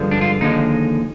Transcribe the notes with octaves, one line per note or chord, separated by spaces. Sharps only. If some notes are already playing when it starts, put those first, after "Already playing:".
Already playing: G2 D3 F3 G#3
D4
F4
D#2 D3 F3 G#3 D#4